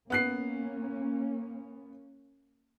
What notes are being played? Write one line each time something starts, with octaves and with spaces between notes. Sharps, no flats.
A#3 B3 C#4 F#6 C7